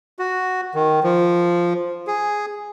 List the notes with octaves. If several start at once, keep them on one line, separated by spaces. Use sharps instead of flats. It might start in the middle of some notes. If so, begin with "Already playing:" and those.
F#4
D#3
F3
G#4